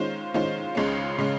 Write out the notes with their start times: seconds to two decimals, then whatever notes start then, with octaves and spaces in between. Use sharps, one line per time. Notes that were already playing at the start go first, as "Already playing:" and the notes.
Already playing: D#3 G#3 C#4 F4 C5
0.34 D#3 G#3 C#4 F4 C5
0.75 C#2 C#3 G#3 C#4
1.18 C#3 G#3 C#4